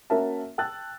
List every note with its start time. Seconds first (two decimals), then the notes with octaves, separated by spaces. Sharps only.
0.10 A#3 C#4 F#4 A#4 E5 A5
0.58 G5 A5 E6 F#6 A6